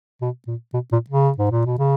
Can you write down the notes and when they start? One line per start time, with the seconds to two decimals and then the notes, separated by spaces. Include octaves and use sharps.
0.22 B2
0.47 A#2
0.74 B2
0.92 A#2
1.10 C#3
1.38 G#2
1.51 A#2
1.66 B2
1.79 C#3